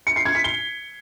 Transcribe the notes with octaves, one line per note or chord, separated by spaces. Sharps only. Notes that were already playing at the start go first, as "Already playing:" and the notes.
C#7
C7
G#6
B6
G7